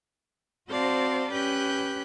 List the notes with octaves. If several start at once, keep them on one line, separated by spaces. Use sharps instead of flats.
C4 F#4 C5 D5 F5 A5
C#4 G4 B4 F#6 G6